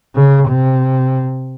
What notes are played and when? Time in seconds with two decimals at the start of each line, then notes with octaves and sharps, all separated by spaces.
0.15 C#3
0.48 C3